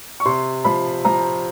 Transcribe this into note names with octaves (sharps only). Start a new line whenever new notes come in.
C#6
C3 C6
F3 B5
F3 A#5